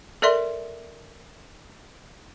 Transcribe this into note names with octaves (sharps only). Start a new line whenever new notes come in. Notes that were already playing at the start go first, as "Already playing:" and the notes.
A4 A#4 D5 E5 C6